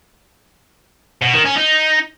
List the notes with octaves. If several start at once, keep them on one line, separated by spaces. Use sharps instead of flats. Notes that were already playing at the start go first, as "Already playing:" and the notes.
B2
D#3
C#4
D#4